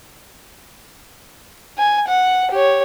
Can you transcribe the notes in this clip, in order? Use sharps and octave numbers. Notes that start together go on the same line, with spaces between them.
G#5
F#5
G4 C#5